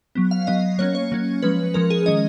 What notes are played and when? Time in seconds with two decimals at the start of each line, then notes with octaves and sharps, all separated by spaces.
0.15 F#3 B3
0.31 F5
0.47 F#3 B3 D#5
0.78 F#3 A#3 C#4 C#5
0.95 C#5
1.12 F#3 A#3 C#4
1.42 F3 G#3 C#4 B4
1.74 F3 G#3 C#4 A#4
1.90 G#4
2.06 D#3 G#3 C#4 D#5